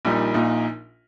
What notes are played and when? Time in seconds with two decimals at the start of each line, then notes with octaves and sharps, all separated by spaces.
0.05 A#1 A#2 G3 D#4
0.34 A#1 A#2 A#3 D#4